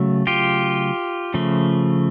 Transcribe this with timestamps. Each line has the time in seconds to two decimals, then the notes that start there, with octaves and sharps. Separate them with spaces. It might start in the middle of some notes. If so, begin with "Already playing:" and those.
Already playing: C#3 F#3 A3
0.27 F4 G4
1.34 C#3 F3 A3